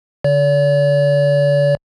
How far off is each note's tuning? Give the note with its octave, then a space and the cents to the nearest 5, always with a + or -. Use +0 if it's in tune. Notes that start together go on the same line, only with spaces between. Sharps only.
D3 -25 D5 -45